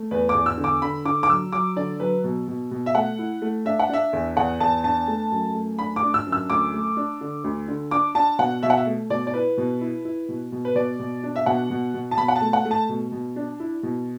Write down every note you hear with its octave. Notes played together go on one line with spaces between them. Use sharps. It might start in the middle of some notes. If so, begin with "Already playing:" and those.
Already playing: A3
E2 B4
D6
E2
E6
D3
D6
D3 B5
D3 D6
D6
F#3 E6
F#3 D6
D3 D5
F#3 B4
B2
B2
B2
E5
A3 F#5
E4
A3
D4 E5
F#5
D4 E5
E2
E2 F#5
E2 A5
D4 A5
A3
F#2
A3
D4 B5
D6
D4
E6
F#2
E6
D2 D6
A3
D4
D3
D2
D3
D4 D6
D4 A5
B2 F#5
B2 E5
F#5
E5
A3
B2 D5
D5
E4 B4
B2
E4
E4
B2
B2
B4
B2 D5
B2
D4
E5
B2 F#5
B2
B2
A5
B2 B5
F#5
A5
A3
F#5
A3
A5
B2
B2
D4
E4
B2